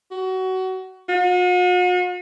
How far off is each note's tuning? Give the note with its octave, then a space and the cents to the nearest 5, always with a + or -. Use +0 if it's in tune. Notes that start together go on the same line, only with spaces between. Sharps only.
F#4 +20
F#4 -45